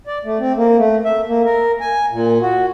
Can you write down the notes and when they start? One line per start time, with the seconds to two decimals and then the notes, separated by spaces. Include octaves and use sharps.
0.07 D5
0.25 A3
0.39 C4
0.57 A#3
0.77 A3
1.05 E5
1.28 A#3
1.45 A#4
1.81 G#5
2.12 A#2
2.42 F#4